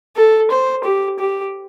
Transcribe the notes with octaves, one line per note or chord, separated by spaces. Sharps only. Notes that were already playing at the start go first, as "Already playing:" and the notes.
A4
C5
G4
G4